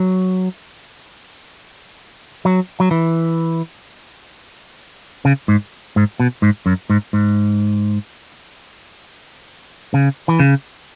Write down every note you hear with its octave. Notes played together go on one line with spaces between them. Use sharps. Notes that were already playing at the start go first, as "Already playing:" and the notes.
Already playing: F#3
F#3
F#3
E3
C#3
G#2
G#2
B2
G#2
F#2
G#2
G#2
C#3
E3
C#3